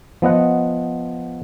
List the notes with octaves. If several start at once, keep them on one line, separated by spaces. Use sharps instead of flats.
F3 B3 D#5 F#5